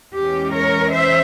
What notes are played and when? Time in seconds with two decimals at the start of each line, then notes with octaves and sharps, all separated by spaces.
0.14 E2 E3 G#3 C#4 G4
0.53 A#4 C#5
0.92 C5 E5